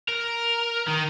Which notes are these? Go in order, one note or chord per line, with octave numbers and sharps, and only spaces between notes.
A#4
D#3